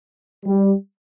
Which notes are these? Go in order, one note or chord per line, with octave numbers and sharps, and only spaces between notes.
G3